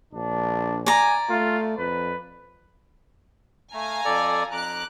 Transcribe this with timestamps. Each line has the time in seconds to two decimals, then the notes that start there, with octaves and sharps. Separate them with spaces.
0.13 A#1 D4
0.86 D5 G#5 A#5
1.29 A3 F4
1.78 F2 B4
3.73 A3 F5 G#5 A#5
4.05 F2 A4 D5
4.51 F2 A#5 D6 F#6